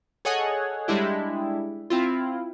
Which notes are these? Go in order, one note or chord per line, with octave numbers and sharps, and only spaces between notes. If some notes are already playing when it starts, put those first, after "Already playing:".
G#4 A4 C#5 D#5 F#5 G#5
G3 G#3 D4 E4 G4
C4 E4 F4